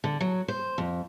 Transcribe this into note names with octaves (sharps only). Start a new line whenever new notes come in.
D3
F#3
C5
F2